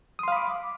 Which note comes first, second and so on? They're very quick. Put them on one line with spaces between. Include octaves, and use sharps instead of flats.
D#6 C6 F5 B5 D6